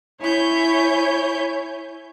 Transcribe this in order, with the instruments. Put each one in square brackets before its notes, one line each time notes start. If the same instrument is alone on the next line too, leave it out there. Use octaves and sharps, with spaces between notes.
[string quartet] E4 C#5 G#5 G6